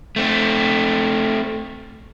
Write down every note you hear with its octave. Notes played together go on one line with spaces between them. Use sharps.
A3 C4